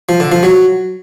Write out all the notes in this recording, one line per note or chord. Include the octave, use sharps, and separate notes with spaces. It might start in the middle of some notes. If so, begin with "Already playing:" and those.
F3
D3
F3
F#3